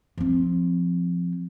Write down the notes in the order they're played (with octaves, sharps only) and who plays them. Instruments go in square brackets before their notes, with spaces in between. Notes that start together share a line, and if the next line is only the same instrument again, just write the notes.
[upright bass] F3 C4